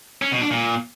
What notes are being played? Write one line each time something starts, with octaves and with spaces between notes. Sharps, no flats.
C#4
B2
D4
A#2